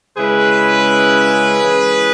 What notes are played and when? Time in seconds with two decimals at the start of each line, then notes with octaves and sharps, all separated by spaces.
0.16 C#3 G#3 C#4 E4 G#4 B4
1.63 E3 G#3 C#4 E4